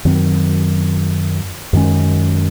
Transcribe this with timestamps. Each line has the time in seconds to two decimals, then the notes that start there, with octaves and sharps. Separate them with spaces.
0.05 F#2 D#3 F#3 C4
1.73 F#2 D#3 G#3 C#4